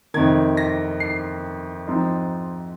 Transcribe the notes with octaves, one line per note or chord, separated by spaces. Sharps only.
F2 C3 D#3 G#6
A#6
C7
G#2 F3 C4 D#4